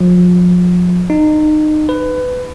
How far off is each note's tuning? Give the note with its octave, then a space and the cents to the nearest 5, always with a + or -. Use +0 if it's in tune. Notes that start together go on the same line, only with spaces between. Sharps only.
F3 +35
D#4 -25
B4 +20